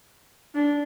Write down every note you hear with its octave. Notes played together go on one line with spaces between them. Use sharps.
D4